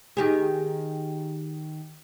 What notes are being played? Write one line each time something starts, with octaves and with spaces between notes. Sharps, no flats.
D#3 G4 G#4